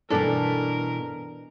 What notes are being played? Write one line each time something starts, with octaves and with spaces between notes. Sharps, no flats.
G2 B2 E3 D4 A4 A#4